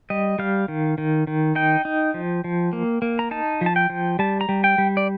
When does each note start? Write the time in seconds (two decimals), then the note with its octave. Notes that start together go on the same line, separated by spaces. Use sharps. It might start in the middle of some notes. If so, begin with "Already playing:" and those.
0.10 G3 D#5
0.39 G3 F5
0.68 D#3
0.98 D#3
1.27 D#3
1.55 D#4 G5
1.85 D#4
2.14 F3
2.44 F3
2.73 A#3
3.02 A#3
3.19 A#5
3.31 D#4 A5
3.61 F3
3.66 A5
3.76 G5
3.90 F3
4.19 G3 A5
4.41 A#5
4.49 G3
4.64 G5
4.78 G3
4.97 D5